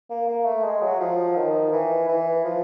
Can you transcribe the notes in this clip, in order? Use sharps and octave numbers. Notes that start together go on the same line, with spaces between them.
A#3
A#3
A3
G#3
F#3
F3
D#3
E3
E3
F3